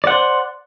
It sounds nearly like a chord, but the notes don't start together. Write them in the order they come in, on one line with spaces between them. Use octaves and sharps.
D5 F#5 C5